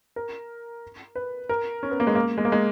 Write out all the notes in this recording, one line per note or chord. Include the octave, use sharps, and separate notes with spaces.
A#4
B4
A#4
C#4
B3
A#3
G#3
A#3
G#3
A#3
G#3